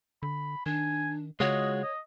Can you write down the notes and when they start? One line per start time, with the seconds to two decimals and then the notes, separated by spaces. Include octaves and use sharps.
0.23 D3 B5
0.66 D#3 D4 G#5
1.40 C#3 G#3 F4 F#4 C#5 D#5
1.83 D#5